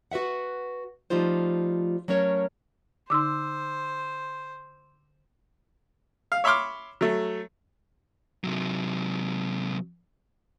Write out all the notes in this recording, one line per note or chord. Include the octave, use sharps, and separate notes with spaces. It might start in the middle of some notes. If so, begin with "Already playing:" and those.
F#4 B4 E5 F#5
F3 G3 A3 D#4 F4 C5
F#3 A3 C#4 A#4 C#5
D3 D#4 C5 C6 D6 E6
F5
C#5 E5 B5 C6 D6 F6
F#3 A3
C3 F#3